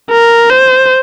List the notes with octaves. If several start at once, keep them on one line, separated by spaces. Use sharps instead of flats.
A#4
C5